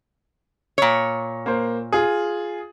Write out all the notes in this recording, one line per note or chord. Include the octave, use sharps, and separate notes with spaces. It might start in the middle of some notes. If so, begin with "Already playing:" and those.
A#2 C#5
A#3 C5
F4 G#4